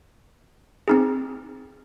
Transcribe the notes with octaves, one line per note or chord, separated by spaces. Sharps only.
C4 D#4 G#4